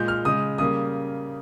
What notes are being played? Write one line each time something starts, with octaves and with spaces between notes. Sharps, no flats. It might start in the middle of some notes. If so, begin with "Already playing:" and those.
Already playing: A#2 G#3 G6
F6
C#3 G#3 D#6
C#3 G3 A#3 D#6